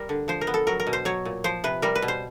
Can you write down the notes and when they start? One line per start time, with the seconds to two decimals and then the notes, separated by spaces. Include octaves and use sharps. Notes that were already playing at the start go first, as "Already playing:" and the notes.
Already playing: G3 A#4
0.09 D3
0.28 F3 C5
0.41 A#4
0.47 B3
0.54 A4
0.67 F#3 A#4
0.80 A#4
0.87 B2
0.93 C5
1.05 F#3 C#5
1.25 A#2
1.44 F3 C5
1.64 C3 B4
1.82 G3 A#4
1.95 B4
2.02 B2
2.08 C5